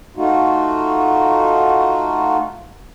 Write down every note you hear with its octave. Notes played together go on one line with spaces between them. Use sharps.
A3 D#4 F4 F#4